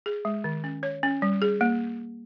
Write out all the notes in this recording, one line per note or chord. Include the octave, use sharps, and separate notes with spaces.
G#4
G#3
D#3
C#4
C#5
C#4
G3
G#4
A#3